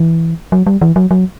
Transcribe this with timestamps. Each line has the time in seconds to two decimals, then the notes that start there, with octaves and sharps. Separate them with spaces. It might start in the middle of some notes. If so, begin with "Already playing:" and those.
Already playing: E3
0.52 F#3
0.67 G3
0.82 E3
0.96 F#3
1.11 F#3